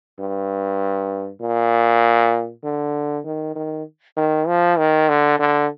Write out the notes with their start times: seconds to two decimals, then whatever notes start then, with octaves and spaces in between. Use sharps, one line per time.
0.19 G2
1.41 A#2
2.64 D3
3.25 D#3
3.55 D#3
4.17 D#3
4.47 F3
4.78 D#3
5.09 D3
5.39 D3